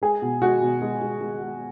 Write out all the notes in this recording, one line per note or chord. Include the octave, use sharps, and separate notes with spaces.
G#3 G#4
B2
G#3 F#4
B2
G#3
G#3
G#3
G#3